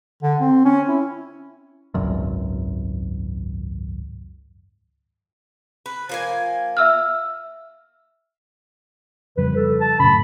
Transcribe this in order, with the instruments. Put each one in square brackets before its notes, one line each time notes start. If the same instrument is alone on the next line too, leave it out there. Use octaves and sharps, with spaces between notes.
[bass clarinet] D3
C4
C#4
E4
[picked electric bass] G#1 C#2 F#2
[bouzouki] B4
F3 A#3 G#5
[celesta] E5 E6 F6
[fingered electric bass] F2 C#3 G3 [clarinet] B4
[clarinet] A4
A5
[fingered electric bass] F#2 A2 C#3 [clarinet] B5